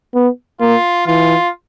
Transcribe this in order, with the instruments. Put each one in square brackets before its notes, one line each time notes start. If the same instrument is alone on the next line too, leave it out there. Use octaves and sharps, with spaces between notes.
[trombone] B3
[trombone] A#3 [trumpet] F4
[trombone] E3 [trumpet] F4